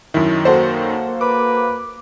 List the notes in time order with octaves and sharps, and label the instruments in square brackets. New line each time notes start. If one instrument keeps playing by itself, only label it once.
[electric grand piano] F#2 D#3 [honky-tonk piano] E4
[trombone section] A#3 [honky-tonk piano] F#4 A4 C5
[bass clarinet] B4 [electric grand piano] D6